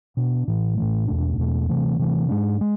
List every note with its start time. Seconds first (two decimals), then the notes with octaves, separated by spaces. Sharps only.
0.17 B2 B3 D4
0.48 A2 E3 A3
0.77 A2 E3 A3
1.07 E2 B2 A3 D4
1.38 E2 B2 A3 D4
1.69 C3 E3 A3
1.99 C3 E3 A3
2.29 G#2 G#3 D4
2.61 G#3